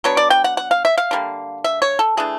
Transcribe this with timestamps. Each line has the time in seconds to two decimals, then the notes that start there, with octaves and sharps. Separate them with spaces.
0.04 F#3 B3 D4 C#5
0.17 D5
0.30 G5
0.44 F#5
0.57 F#5
0.71 F5
0.85 E5
0.98 F5
1.11 D3 G3 A#3
1.64 E5
1.82 C#5
1.99 A4
2.17 E3 A3 D4 G#4